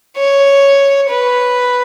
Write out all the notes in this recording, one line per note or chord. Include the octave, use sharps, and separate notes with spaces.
C#5
B4